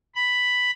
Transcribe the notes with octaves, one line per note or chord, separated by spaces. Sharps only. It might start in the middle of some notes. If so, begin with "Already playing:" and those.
B5